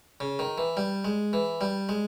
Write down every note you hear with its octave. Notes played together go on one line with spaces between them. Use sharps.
C#3
D#3
E3
G3
G#3
E3
G3
G#3